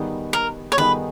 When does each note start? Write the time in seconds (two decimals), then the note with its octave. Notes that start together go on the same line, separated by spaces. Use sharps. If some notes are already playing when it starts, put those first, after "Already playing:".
Already playing: D#3 G3 B3 D#4 G#4
0.33 A#4
0.72 C#5
0.77 D#3 G3 B3 D#4 G#4 B4